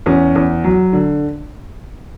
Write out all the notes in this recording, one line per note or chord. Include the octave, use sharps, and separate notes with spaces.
E2 C#4
E2
F#3
D3